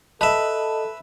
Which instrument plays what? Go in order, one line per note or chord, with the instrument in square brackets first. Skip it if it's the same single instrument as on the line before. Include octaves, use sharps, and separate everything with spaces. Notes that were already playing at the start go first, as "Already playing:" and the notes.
[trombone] A4 [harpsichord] B4 E5 [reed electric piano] D#5 [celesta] A5